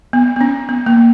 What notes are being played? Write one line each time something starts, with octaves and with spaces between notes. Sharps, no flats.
B3
B3
C#4
B3
A#3